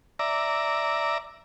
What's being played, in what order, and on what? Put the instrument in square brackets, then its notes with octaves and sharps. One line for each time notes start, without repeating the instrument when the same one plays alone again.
[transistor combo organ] D5 E5 A#5